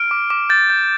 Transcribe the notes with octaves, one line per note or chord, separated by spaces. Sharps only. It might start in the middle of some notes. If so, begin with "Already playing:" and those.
Already playing: F6 D7
D6
D6
G6 A6
G6